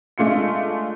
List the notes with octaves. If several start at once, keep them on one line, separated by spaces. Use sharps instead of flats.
G#3 A3 D4 F4 C#7